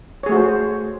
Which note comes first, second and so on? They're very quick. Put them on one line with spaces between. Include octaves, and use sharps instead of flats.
C#5 G#4 A3 F#4 C5